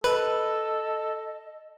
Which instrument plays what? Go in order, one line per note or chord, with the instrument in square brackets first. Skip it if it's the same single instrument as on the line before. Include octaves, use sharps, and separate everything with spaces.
[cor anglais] A4 [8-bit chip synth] B4 [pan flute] D#5